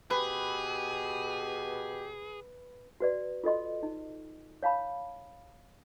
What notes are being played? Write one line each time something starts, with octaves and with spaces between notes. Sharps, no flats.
B2 G4 G#4 B4
F#4 B4 D5
F4 A4 D#5 C6
D#4
C#5 F5 A5 B5